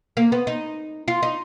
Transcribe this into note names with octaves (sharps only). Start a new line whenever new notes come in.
A#3
B3
D#4
F4
D#4